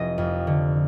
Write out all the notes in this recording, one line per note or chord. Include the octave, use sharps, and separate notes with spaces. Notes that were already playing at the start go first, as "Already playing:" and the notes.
Already playing: F1 D#5
F2
D3